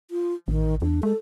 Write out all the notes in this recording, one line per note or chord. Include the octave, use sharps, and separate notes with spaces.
F4
A1 D#3
E2 D4
G#3 A4